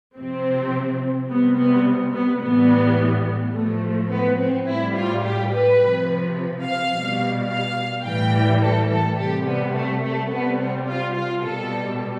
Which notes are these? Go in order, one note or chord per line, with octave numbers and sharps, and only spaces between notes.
C3 F3 C4
C3 G3 B3
B3
B3
A2 E3 G3 B3
A2 F3 A3
B3
C4
A2 G3 E4
F4
G4
B4
C3 F3
F5
B2 G3
F5
A2 E3 G3 G5
A4
A4
C3 G3 G4
B3
A3
A3
C3 G3 B3
C4
F4
F4
B2 G3 A4